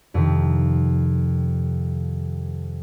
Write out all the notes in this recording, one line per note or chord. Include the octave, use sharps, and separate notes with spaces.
F2 C3 D#3